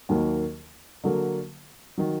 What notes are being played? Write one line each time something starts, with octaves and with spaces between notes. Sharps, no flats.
D#2 D#3 F#3 A#3
D3 F#3 A#3
D#3 F#3